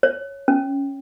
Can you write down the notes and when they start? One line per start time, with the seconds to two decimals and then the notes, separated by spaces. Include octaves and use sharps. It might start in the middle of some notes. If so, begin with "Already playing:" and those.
0.03 C#5
0.48 C#4